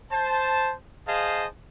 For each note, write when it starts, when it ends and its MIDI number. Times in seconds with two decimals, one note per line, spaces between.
0.12 0.73 72
0.12 0.73 81
1.07 1.46 68
1.07 1.46 72
1.07 1.46 75
1.07 1.46 77
1.07 1.46 81